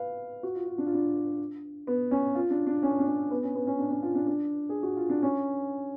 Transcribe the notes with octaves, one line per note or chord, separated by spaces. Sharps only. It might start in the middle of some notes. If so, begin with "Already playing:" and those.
Already playing: B4 F5
F#4
F4
F4
D4
F4
D4
B3
C#4
F4
D4
D4
C#4
D4
C#4
B3
C#4
B3
C#4
D4
C#4
F4
D4
D4
G#4
F#4
F4
D4
C#4